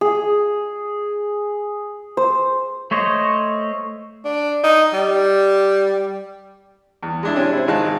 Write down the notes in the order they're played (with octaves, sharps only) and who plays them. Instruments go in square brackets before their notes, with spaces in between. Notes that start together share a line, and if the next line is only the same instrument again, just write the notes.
[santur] G#4
C5
[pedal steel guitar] A3 C5 C#5 D#5
[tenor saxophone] D4
D#4
G3
[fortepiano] E2
G#3 D4 E4
C3 C#4 D4 G4
E4 C5
G#1 G#3 D#4 F5 A5 F#6